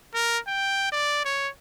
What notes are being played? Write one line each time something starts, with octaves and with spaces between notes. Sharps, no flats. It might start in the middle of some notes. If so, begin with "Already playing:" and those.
A#4
G5
D5
C#5